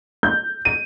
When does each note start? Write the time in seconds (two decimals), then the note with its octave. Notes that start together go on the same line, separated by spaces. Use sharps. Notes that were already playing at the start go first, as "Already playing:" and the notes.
0.23 G6
0.65 D#7